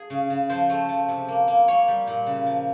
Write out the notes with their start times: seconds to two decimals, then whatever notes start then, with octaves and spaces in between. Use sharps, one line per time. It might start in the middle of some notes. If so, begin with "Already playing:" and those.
Already playing: G#4
0.10 C#3
0.30 C#3
0.50 F3 C5
0.69 A3
0.89 F3
1.08 C3
1.28 A#3
1.48 A#3
1.68 A#3 C#5
1.88 G3
2.07 A#2
2.27 C#3
2.46 F3